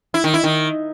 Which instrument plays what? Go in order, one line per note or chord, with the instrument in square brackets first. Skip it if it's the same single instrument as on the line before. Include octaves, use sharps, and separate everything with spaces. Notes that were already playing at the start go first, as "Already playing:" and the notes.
[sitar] E4
D#3
E4
D#3